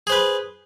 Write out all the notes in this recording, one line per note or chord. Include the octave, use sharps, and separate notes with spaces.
G#4 B4 C5